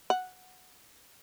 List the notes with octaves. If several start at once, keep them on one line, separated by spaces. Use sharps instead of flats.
F#5